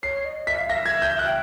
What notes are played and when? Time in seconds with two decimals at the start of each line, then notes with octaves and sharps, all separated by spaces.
0.03 C#5 C7
0.25 D#5
0.47 E5 B6
0.58 F5
0.69 E5 A#6
0.86 G#6
1.02 G6
1.19 F#6
1.26 G5